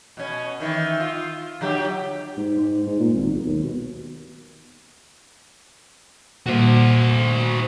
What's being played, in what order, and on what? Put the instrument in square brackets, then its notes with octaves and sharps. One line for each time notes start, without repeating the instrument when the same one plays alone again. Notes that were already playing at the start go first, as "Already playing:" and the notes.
[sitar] B2 C#4
D#3 E3 B4
F4
D3 F#3 G4
[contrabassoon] G#2
G#2
G#2
A#2
G#1
B1
D#2
B2
[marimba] A#2 G3 A#3 [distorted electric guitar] F#4 C5